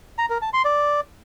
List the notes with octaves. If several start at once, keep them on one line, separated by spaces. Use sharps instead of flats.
A#5
A#4
A5
C6
D5